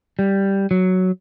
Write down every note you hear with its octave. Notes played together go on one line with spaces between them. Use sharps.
G3
F#3